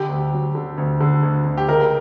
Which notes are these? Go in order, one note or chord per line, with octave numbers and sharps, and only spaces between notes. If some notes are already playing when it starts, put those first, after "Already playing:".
Already playing: D3 G4
D2
F#3
D3
D2
D3
D2
D2
G4
C#2 A#4